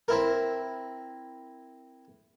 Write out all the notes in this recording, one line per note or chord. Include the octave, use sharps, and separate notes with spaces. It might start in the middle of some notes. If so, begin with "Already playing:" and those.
C4 E4 A#4